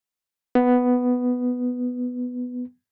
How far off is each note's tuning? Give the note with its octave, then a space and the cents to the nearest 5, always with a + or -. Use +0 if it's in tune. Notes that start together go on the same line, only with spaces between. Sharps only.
B3 +5